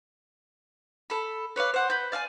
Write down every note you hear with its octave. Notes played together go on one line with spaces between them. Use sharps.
A4 B5
B4 C#5 D5 F5
C5 F#5
B4 G6
D5 F5 G5 G#5